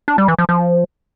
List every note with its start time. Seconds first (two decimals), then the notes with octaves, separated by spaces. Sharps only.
0.08 D4
0.18 G3
0.28 E3
0.39 F3
0.49 F3